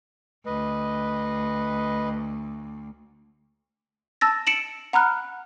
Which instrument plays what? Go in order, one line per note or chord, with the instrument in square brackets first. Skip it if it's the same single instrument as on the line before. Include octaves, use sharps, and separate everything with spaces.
[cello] D2 [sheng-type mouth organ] B4 D#5
[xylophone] A5 E6 A6 A#6
C#7 D7 E7 F#7
F#5 A#5 B5 F6 F#6